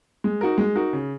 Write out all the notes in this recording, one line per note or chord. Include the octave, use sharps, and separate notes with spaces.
G#3
D#4 F#4 A#4
G#3
D#4 F#4 A#4
C#3